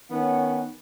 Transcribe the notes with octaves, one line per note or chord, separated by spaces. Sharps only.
D#3 B3 C#4 F#5